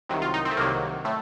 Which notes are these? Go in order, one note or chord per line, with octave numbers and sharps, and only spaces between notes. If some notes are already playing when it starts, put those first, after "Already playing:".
C2 C3 D#3 F#3
F4
D#4
C4
A3
C2 C3 D#3 F#3 A#3
A2 A3